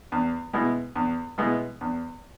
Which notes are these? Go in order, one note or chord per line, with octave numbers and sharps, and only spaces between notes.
E2
B2 G#3 B3 E4
E2
B2 G#3 B3 E4
E2